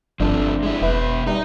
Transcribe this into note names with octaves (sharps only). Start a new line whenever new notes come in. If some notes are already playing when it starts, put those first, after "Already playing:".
G1 F3 A3 C4 D4
G#3 E4
F1 B2 B4 E5
G3 D#4 A#5